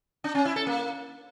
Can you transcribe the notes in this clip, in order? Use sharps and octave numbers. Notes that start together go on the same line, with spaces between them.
D4
C#4
E4
A4
A#3